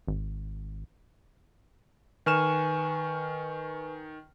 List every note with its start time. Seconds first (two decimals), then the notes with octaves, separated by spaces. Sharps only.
0.07 G#1
2.26 D#3 B4 G#5 C#6 F6 E7